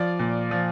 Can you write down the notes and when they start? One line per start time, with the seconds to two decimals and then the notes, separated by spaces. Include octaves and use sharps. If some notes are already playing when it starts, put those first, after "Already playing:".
Already playing: F3 D5
0.19 A#2
0.51 F3